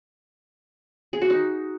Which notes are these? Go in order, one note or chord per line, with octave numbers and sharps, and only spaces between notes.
G#4
F#4
D#4